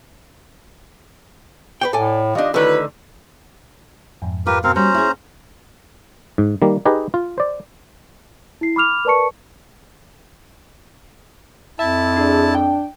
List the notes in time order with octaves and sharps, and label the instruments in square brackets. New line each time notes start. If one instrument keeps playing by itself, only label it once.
[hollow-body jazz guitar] B4 C#5 G5
[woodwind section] A2 [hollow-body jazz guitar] A4 D5 G#5
[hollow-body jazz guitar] D#3 D4 [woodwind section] F4 G4 D#5
[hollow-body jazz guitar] D3 D#3 A3 [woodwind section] F#3 E4 B4
[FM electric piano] F2 G#2
[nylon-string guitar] F4 [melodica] G4 A#4 B4
[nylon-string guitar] B2 [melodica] C4 A#4 F5
[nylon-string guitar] G3 [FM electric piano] A#3 F#4 [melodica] C#4 C5 A#5
[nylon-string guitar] E4 G#4
[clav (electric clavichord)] G#2
D#3 G3 A#3
D#4 G4 G#4 B4 D#5
F4
C5 D5
[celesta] E4 C7
B5 D6 F6 F7
A#4 B4 D5 A5 C#6 C#7
[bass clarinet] F2 [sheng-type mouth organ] E4 A5 [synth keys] E5
[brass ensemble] D4 [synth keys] G#4
[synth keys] G5